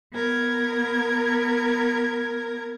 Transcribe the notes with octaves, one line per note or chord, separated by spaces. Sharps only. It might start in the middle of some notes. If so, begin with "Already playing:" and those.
B3 A#4 G#6